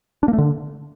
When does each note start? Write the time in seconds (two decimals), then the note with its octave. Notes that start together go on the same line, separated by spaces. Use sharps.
0.23 D4
0.28 A#3
0.33 A3
0.38 D3